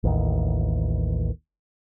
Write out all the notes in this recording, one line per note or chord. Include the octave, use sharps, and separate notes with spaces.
A1 D#2